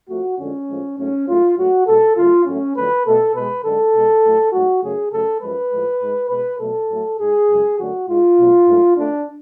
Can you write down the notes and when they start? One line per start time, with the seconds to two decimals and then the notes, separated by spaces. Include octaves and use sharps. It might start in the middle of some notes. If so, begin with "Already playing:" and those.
0.09 F2 F3 A3 F#4
0.39 F2 D3 F3 G#3 C#4
0.68 A2 F3 G#3
0.99 G#2 F#3 A3 C#4
1.28 G#2 F#3 A3 F4
1.57 G#2 F#3 A3 F#4
1.87 B2 G#3 A4
2.16 F#2 C#3 F#3 A3 F4
2.46 A2 F#3 A3 C#4
2.76 F2 D3 F#3 A3 B4
3.05 B2 A3 A4
3.34 B2 G#3 B4
3.64 F#2 D3 G#3 A4
3.93 B2 G#3
4.24 A2 F#3 A3
4.53 G#2 F#3 A3 F#4
4.83 F#2 C#3 F#3 A3 G#4
5.12 F#2 C#3 F#3 A3 A4
5.42 F#2 F3 G#3 B4
5.72 A2 F3 G#3
6.00 G#2 G#3
6.30 B2 G#3 B4
6.59 B2 F#3 A3 A4
6.89 A2 F#3 A3
7.19 G#2 G#3 G#4
7.48 F#2 C#3 G#3
7.78 F#2 D3 F#3 A3 F#4
8.08 G#2 G#3 F4
8.38 B2 F#3 A3
8.67 G#2 F#3 A3
8.96 F2 F3 A3 D4